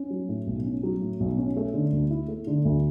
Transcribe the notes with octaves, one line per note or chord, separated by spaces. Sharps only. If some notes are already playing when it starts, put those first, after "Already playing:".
Already playing: C#4
F#3
A2
B1
C#4
F#3
A2
B1
C#4
A3
D3
D2
E4
A3
D3
D2